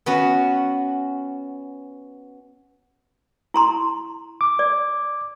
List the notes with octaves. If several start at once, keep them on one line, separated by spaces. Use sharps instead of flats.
B3 C#4 F#4
E4 A#5 C6
D6
D5